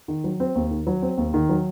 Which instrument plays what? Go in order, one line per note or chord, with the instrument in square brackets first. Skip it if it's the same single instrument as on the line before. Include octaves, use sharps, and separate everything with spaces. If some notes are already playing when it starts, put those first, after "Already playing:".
[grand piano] D#3
F#3
C4
D#2
D#3
F#3
C4
D#2
D#3
F#3